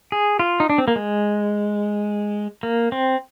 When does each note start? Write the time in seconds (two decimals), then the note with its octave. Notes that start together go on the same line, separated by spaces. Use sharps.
0.12 G#4
0.39 F4
0.60 D#4
0.70 D4
0.78 C4
0.88 A#3
0.96 G#3
2.63 A#3
2.92 C4